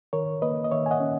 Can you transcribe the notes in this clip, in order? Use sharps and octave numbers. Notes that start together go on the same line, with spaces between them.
D#3 A#4 C#5
A#3 B4 D#5
D#5
D#3 C#5 E5
G#5
D#5 F#5
C#4